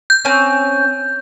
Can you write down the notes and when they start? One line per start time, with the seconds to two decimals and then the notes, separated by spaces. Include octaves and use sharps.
0.10 G6
0.25 C4 C#4